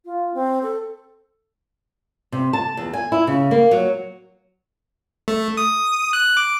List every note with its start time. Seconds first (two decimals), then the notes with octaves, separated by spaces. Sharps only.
0.05 F4
0.34 C4
0.63 A4
2.32 C3
2.53 A5
2.77 E2
2.93 G#5
3.12 E4
3.27 C#3
3.51 A#3
3.71 F#3
5.28 A3
5.57 D#6
6.13 F#6
6.37 D6